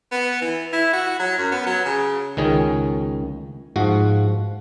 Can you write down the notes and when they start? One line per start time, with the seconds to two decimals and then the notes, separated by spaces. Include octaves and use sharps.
0.12 B3
0.42 E3
0.73 E4
0.93 F#4
1.19 F#3
1.38 F#2
1.52 B3
1.66 F#3
1.85 C#3
2.37 C#2 D#3 C#4 G#4
3.76 G#2 F3 F#4